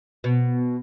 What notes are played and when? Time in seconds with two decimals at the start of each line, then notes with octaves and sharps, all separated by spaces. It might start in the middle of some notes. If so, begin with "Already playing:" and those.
0.24 B2